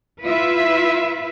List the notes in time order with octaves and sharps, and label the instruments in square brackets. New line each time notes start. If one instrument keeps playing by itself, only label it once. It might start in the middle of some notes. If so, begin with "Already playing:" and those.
[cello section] E4 F4 B4 E5